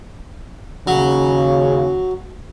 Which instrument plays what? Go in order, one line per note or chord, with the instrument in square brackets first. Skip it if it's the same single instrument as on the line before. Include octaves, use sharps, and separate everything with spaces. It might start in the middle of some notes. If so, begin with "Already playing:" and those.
[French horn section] D#2 C#3 [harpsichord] F#3